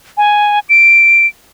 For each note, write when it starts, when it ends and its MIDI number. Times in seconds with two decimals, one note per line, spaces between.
0.17 0.59 80
0.69 1.26 98